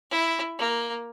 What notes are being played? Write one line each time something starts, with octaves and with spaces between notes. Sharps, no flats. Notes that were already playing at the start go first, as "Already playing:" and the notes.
E4
A#3